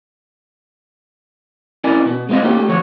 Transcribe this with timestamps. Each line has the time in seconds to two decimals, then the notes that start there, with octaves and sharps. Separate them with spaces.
1.84 C#4 E4 A#4 D5 D#5 G#5
2.06 B2 B3
2.29 G#3 C4 D#4 F4 D#5
2.42 A#3 B3 C#4 D#4 F4 G4
2.55 A3 G4
2.68 D2 F3 C#5